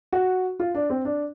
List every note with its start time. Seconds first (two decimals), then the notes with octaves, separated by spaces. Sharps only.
0.13 F#4
0.60 F4
0.75 D4
0.90 C4
1.05 D4